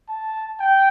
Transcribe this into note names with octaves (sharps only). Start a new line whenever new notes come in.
A5
G5